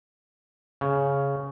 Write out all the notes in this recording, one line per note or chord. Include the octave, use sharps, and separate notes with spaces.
C#3